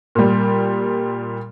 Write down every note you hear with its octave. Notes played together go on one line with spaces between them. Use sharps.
A#2 G3